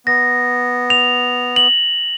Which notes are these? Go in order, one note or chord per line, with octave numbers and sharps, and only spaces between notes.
B3 A#6
F7
F#7